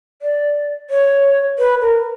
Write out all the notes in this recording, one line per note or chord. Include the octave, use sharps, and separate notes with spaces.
D5
C#5
B4
A#4